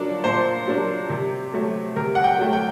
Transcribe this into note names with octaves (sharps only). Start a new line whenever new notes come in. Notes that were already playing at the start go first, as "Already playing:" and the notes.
Already playing: A#2 F#3 A#3 D4 D5
A#2 C5
F#3 A#3 D4
C3
F#3 A3
C3 A#4
F#5
G5
F#3 A3
G5